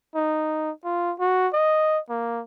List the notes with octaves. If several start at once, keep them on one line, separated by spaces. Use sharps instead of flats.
D#4
F4
F#4
D#5
A#3